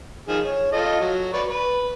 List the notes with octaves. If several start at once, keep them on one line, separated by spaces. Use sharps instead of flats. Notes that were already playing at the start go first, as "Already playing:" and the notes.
D#3 F3 G#4
C#5
F4 A4 D#5
F#3
B4 D5 C#6
B4